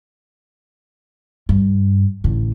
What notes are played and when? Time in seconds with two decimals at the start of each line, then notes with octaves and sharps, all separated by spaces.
1.49 G2
2.24 A1 D3